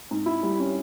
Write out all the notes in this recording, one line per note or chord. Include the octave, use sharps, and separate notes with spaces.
G#2
E4
G3
C#4